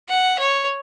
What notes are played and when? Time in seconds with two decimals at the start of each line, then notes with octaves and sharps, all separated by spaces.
0.08 F#5
0.38 C#5